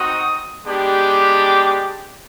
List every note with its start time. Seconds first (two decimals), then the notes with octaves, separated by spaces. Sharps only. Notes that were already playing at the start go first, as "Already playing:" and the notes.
Already playing: C4 D#4 F#4 D#6
0.66 G#3 B3 D4 G4
1.42 D6